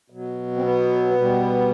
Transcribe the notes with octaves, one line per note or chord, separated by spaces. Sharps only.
B2 F#3
C4
B3
B2 G3